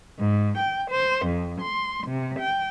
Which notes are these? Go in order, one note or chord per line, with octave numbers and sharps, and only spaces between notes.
G#2
G5
C5
F2
C6
C3
G5